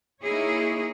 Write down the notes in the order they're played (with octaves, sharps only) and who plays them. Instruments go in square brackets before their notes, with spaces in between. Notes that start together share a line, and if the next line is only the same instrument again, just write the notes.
[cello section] A#3 D#4 E4 G#4 C#5